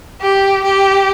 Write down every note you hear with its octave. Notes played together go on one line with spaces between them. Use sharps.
G4
G4